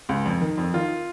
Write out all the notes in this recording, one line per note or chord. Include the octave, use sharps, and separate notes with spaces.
C#2
F2
D#3
F2
D#3 F4